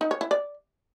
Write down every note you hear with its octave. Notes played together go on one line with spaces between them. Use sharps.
D#4
C#5
E4
D5